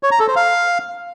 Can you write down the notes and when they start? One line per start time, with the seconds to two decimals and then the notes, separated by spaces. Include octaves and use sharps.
0.03 C#5
0.11 A#5
0.19 A4
0.28 C5
0.36 F5